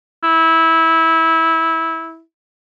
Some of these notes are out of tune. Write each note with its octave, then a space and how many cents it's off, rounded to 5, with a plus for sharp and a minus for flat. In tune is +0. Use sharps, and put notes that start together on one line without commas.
E4 -15